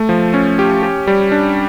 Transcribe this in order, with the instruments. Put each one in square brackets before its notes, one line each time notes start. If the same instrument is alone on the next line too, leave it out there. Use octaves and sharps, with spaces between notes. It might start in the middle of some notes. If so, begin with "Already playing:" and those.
Already playing: [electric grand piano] A3
F3
C#4
G4
G4
G3
D4